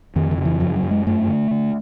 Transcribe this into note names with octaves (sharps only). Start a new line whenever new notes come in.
F2 D#3
D#3
C#3
E3
F#2 F3
F#3
F#2
G#3
G2 A3
D3
D3